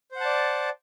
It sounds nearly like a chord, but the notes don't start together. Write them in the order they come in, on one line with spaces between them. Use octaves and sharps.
C5 F#5 A5 D5